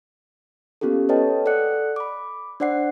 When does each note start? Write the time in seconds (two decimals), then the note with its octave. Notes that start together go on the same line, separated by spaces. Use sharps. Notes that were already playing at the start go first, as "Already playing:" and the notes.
0.81 A#3 B3 C#4 F4 G4 A4
1.09 A4 B4 C#5 D#5 G5 A5
1.46 A4 D5 F#5 F#6 C#7
1.96 B5 D6
2.60 D4 C5 D5 F#5 C7